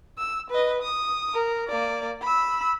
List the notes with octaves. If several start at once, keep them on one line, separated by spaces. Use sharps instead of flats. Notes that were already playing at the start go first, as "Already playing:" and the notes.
E6
B4 D#5
D#6
A#4
A#3 D5
B5 E6